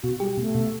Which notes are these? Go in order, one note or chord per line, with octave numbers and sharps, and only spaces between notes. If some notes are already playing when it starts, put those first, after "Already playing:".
B2 F#4
G3 G4
B2 A3
B2